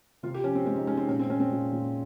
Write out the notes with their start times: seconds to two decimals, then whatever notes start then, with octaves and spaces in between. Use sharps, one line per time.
0.23 C3 F4
0.34 G4
0.44 F3 C#4
0.55 C4
0.66 G#3 C4
0.76 D#4
0.87 G#3 C#4
0.97 C4
1.08 A#2 C#4
1.19 C4
1.29 A#2 C#4
1.40 C4
1.51 A#2
1.72 A#2